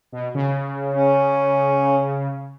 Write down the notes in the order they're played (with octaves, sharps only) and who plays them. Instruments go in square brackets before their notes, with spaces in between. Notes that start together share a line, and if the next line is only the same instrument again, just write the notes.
[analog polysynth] B2
C#3
[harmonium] C#4